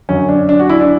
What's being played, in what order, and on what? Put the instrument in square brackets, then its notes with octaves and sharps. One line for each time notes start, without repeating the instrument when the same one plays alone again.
[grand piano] F#2 D3 F#3 C#4
D4
D4
F#4
E4
D4